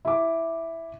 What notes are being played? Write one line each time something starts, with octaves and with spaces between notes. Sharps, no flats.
E4 D6